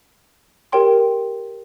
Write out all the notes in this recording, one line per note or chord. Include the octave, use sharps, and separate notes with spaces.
G4 A#4 C#5 G5 C6